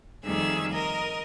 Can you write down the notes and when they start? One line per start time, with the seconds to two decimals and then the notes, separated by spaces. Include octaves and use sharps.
0.24 F2 D#3 G3 A3 G#4 E6
0.72 A#4 D#5